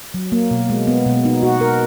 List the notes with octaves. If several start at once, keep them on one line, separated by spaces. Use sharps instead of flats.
F#3
A#3
B2
G#3
B3
B2
D#4
F#4
A#4